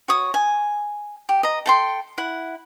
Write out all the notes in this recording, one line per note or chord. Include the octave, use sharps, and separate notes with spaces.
F#4 C#5 D#6
G#5
G4
D#5 A#5
A4 G5 C6
E4 F#5